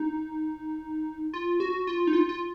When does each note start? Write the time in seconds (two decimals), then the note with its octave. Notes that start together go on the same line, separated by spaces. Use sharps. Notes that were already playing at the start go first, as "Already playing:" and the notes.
Already playing: D#4
1.33 F4
1.60 F#4
1.87 F4
2.07 D#4
2.13 F4
2.29 F4